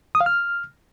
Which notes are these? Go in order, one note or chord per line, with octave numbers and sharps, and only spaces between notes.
D#6
F5
F6